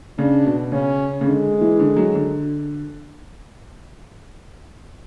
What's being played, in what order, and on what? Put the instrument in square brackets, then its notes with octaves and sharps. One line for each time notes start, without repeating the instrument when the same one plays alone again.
[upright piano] C#3 [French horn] D4
[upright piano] B2
[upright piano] C#3 [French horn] C#4
[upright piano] C#3
[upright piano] D3 [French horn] G#3
[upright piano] E3
D3
F#3
D3